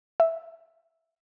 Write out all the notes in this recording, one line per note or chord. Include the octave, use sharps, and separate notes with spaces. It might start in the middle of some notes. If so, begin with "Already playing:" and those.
E5